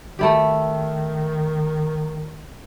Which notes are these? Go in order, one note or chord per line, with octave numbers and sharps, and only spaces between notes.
D#3 A3 E4 G4